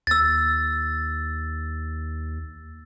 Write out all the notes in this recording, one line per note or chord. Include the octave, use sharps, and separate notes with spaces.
D#2 E6 A6